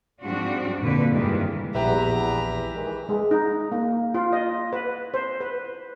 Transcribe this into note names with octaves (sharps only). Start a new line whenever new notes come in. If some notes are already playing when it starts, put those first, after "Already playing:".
G#2 F3 G3 C4 D4 F#4
F2 A#2 D3 B4
G2 C3 D#3 E3 G3 G#3
A#1 E2 G4 B4 E5 A#5
D#3 E3 G#3
G#3
D#4
A#3
F4
D#5
B4
C5
B4